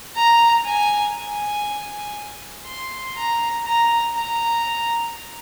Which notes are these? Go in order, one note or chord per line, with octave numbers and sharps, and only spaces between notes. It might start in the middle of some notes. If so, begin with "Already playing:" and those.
A#5
G#5
G#5
C6
A#5
A#5
A#5